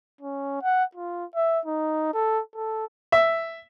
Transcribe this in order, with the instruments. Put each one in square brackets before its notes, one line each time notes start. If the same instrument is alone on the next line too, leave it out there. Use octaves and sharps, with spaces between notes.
[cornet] C#4
F#5
F4
E5
D#4
A4
A4
[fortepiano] E5